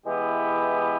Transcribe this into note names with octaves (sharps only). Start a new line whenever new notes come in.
E3 G#3 B3 E4 G4